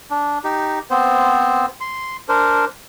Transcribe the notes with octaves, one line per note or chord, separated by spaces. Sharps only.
D4
D#4 G4
B3 C4 C5
C6
D4 A#4 C5